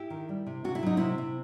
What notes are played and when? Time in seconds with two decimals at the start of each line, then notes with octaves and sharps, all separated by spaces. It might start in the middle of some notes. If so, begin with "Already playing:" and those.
Already playing: E4 G4
0.10 D#3
0.29 G3
0.47 C3
0.64 C3 F#4
0.75 E4
0.83 F#3 D#4
0.97 C3 C4 E4
1.18 C3